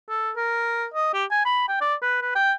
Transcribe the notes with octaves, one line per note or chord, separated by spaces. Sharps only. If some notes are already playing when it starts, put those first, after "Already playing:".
A4
A#4
D#5
G4
G#5
B5
G5
D5
B4
B4
G5